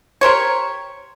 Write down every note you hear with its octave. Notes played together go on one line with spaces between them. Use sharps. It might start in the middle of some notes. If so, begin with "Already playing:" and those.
G4 A#4 C5 C#5